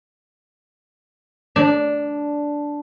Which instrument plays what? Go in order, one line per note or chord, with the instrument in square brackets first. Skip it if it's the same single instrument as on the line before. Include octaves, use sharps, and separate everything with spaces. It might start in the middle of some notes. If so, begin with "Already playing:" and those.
[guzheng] D4